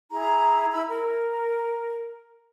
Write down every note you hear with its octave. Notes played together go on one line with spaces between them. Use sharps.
E4 G#4 A#5
E4 B5 E6
A#4